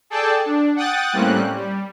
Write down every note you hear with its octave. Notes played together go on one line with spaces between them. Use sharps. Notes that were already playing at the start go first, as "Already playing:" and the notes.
G#4 A4 D5 G5 A5
D4
F#5 G5 D#6 F#6 A6
A2 G3 A#3 C4 C#4 F#6
G3